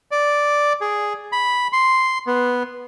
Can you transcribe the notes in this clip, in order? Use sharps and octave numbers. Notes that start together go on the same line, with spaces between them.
D5
G#4
B5
C6
B3